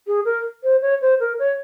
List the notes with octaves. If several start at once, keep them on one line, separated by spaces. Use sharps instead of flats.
G#4
A#4
C5
C#5
C5
A#4
C#5